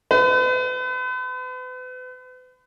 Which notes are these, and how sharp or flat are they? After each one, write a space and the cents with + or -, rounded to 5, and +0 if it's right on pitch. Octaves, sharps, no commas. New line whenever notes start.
B4 +40